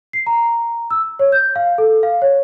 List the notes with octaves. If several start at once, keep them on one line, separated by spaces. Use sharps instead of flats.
C7
A#5
E6
C#5
G6
F5
A4
F5
C#5